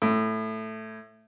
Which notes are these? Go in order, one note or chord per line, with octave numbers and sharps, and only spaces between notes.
A2